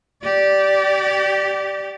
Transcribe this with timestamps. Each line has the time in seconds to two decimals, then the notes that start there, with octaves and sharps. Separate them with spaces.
0.22 G4 D5